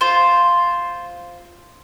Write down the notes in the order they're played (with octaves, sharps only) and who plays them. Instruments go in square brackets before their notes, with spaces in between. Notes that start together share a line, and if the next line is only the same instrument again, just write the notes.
[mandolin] F4 C5